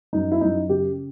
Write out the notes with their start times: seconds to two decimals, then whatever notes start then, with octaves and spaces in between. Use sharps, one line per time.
0.13 F#2 D#4
0.32 E4
0.41 F#2 D#4
0.69 C#3 G4